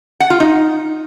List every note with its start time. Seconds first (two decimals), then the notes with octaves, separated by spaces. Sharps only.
0.20 F#5
0.30 F4
0.40 D#4